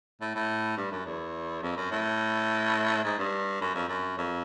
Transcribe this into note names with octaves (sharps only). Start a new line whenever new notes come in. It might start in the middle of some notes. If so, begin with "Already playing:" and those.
A2
A2
G2
F#2
E2
F2
F#2
A2
G#2
G2
F#2
F2
F#2
F2